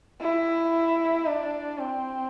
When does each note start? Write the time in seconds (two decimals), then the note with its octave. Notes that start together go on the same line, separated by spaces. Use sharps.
0.21 E4
1.27 D4
1.79 C4